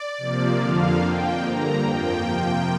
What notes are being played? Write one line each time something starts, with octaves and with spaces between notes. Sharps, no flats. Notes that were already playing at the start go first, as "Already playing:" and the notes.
Already playing: D5
C3 F3 A#3
F2 D3 F3 A#3 F5
F2 F3 A#3 G5
G2 D3 A#3 A#5
F2 F3 A#3 G5
C3 F3 A#3